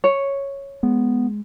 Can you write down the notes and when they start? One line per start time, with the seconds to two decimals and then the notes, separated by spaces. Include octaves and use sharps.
0.04 C#5
0.83 G#3 B3